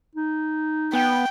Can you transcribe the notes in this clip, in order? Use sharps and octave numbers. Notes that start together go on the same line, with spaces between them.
D#4
B3 G5